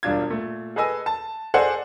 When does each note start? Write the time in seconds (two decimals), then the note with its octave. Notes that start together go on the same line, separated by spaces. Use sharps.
0.03 E1 G2 D4 F4 G#6
0.30 A#2 A3
0.76 G#4 A4 B4 D#5 G#5 E6
1.06 A5
1.54 G#4 A4 C5 D5 D#5 F#5